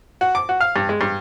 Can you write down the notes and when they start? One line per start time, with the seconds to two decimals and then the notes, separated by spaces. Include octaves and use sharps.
0.21 F#4
0.35 D6
0.49 F#4
0.61 F5
0.76 G2
0.89 G#3
1.01 G2